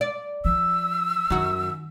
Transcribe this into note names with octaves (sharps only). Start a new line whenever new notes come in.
D5
F3 E6
F#2 D#3 F#4